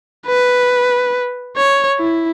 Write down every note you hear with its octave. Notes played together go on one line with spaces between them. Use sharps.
B4
C#5
E4